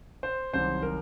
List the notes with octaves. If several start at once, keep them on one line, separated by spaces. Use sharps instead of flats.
C5
C2 C3 D#3 F#3 C5
A#4